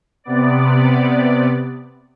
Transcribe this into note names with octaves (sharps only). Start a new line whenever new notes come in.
C3 B3 D5